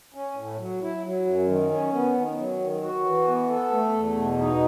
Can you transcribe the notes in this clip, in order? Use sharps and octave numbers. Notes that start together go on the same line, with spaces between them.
C#4
A2
F#3
E4
F#3
F#2
D#3
C#4
B3
D#3
F#3
D#3
F#4
E3
B3
A4
A3
E2
B2
D#4